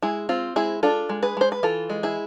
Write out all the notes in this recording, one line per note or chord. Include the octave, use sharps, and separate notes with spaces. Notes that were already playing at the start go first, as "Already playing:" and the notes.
G#3 E4 G#4
C4 F4
G#3 E4 G#4
D4 F4 A4
G#3
G#4 B4
G#3 C5
B4
E3 F4 A4
G#3
E4 G#4